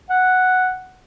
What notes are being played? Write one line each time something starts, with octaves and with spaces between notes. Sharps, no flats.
F#5